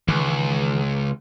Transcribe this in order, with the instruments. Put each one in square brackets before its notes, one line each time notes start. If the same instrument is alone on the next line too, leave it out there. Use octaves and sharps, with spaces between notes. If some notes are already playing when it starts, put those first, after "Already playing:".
[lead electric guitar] C#2 [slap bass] D#3 E3 G#3